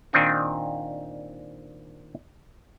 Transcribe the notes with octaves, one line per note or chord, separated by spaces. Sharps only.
A#2 D#3 C4 D4 D#4